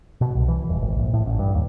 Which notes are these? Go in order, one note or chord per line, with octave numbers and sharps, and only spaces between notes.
B2
C2
E3
D#1
G#1
A#1
A2
A1
G2
D#2